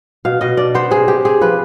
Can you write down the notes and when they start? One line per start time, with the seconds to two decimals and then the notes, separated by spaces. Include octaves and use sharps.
0.25 B2 F5
0.41 B2 D#5
0.57 D4 D5
0.74 B3 C5
0.91 C3 G#4
1.08 C3 G4
1.25 C4 G#4
1.41 F3 B4